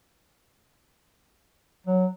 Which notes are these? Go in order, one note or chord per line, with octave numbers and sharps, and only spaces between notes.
F#3